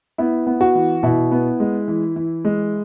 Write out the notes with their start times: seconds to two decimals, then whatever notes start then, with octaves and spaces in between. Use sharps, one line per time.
0.18 B3 E4
0.47 B3
0.61 F#4
0.75 E3
1.03 B2 E4
1.32 B3
1.60 G#3
1.88 E3
2.16 E3
2.45 G#3